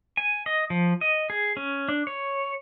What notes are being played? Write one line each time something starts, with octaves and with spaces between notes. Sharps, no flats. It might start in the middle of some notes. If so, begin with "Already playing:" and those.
G#5
D#5
F3
D#5
G#4
C#4
D4
C#5